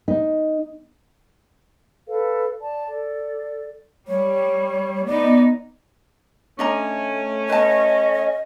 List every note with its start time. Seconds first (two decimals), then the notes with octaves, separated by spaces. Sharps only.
0.08 D#4
2.08 A4 B4 F5
2.60 D5 A5
2.88 A4 D5
4.08 G3 C#5
5.06 B3 D#4 D5
6.59 A3 C#4 D4 D#5 A#5
7.49 B4 D#5 A5